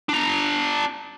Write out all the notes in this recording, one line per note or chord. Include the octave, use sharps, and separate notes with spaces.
D4 A#5